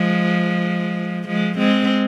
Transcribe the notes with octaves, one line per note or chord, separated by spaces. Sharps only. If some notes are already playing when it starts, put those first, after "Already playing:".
Already playing: F3 G#3
F3 G#3
G#3 C4